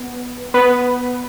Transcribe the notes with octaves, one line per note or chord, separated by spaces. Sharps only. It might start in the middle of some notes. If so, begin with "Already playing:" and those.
Already playing: B3
B3 B4